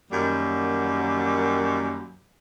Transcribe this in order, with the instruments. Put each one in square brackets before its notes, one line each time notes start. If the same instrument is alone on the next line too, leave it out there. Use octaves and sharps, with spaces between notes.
[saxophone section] F#2 D#3 F#3 G3 A#3